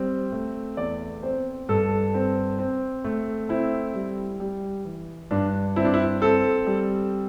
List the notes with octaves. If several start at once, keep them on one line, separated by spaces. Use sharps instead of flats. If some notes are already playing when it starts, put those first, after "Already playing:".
Already playing: G3 C4
A3
E2 D5
C4 C5
G2 A4
C4
C4
A3
C4 E4
G3
G3
E3
G2 D4
C4 E4
D4
E4
C4 A4
G3